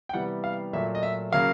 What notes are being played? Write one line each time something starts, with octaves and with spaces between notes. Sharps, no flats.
G5
C3 E3 G3 B3 F#5
F5
A#2 F#3 A3 E5
D#5
E5
C#3 F#3 A#3 F5